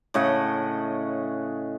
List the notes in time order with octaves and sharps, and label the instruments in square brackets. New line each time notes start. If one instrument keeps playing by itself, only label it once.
[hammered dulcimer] A2 C#3 D#5 F#5